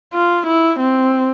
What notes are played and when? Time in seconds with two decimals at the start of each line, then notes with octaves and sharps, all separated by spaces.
0.14 F4
0.46 E4
0.79 C4